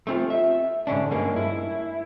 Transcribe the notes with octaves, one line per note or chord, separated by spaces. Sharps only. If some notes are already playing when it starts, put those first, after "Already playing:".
A3 C4 F4
E5
G#2 D3 C#4 D4
G2 G#3 A#3 C#4
E4